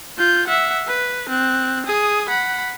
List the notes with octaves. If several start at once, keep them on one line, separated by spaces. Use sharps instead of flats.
F4 G6
E5 F#5
B4
C4 F#6
G#4 D#6
F#5 B5